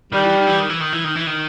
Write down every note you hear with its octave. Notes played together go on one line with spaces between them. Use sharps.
D#3 G3
E3
D#3
E3
D#3
E3
D#3
E3
D#3
E3
D#3